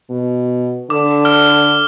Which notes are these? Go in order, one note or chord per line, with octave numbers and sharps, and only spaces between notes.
B2
D3 D6
F6